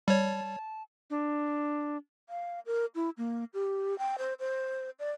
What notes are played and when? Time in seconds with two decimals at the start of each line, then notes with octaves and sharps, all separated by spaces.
0.08 G3 C#5 A5
1.10 D4
2.29 F5
2.66 A#4
2.95 E4
3.18 A#3
3.54 G4
3.99 G5
4.18 C5
4.40 C5
4.99 D5